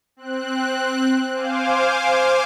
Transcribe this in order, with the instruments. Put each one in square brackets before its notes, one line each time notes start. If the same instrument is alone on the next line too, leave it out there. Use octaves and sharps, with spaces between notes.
[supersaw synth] C4 F#6
C5 F5 G#5 D6